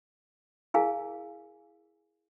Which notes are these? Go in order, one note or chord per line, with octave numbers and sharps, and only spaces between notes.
E4 G#4 A#4 F5 G#5